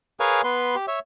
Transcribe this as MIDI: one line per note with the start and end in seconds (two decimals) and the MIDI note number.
0.20 0.41 68
0.20 0.41 70
0.20 0.41 71
0.20 0.41 73
0.20 0.41 77
0.20 0.41 80
0.44 0.75 59
0.44 0.75 71
0.44 0.75 84
0.75 0.86 67
0.88 0.99 73
0.88 0.99 76